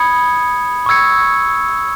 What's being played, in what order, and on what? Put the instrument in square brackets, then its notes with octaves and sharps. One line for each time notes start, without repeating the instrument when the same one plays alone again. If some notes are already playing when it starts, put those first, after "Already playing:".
Already playing: [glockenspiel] B5 D#6 G#6 C#7
C#6 E6 G#6 C#7